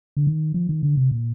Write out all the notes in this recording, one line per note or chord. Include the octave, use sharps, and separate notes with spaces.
D3
D#3
F3
D#3
D3
C3
A#2